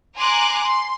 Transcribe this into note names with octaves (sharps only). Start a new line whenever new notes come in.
G#5 A#5 C6 D6 F#6
C6